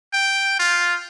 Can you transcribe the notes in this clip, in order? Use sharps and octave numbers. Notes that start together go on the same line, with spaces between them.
G5
F4